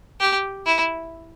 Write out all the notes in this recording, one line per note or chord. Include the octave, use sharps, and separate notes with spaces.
G4
E4